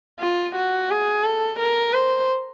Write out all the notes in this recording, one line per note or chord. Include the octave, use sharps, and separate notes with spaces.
F4
F#4
G#4
A4
A#4
C5